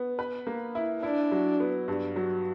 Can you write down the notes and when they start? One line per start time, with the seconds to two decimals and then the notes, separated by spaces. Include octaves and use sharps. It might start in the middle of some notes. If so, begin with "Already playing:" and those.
Already playing: B3
0.19 B4
0.47 A#3
0.75 E4
1.03 D4 E4
1.32 F#3
1.60 B3
1.88 G2
2.16 F#3